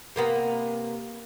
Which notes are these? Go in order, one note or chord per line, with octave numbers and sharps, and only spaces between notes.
C3 A#3 B3